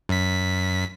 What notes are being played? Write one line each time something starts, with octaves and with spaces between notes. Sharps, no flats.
F#2 B6